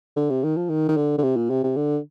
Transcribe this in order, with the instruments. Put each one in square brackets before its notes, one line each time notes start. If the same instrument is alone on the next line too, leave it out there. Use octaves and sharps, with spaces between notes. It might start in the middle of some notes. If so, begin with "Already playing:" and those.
[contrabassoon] D3
C3
D#3
F3
D#3
D#3
D3
D3
C3
A#2
C3
C3
D3